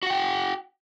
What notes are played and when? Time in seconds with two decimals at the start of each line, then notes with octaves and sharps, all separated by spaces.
0.03 F#4
0.06 F#5
0.10 G5